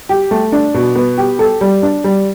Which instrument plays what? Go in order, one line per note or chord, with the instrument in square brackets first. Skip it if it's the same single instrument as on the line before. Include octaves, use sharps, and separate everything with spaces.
[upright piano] G4
A3
D4
B2
B3
G4
A4
G3
D4
G3